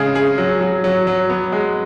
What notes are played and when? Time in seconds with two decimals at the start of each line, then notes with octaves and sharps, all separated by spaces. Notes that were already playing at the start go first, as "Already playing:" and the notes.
Already playing: C#3 G#3 G#4
0.15 G#4
0.38 F#3
0.61 F#3
0.84 F#3
1.07 F#3
1.30 B3
1.52 G#3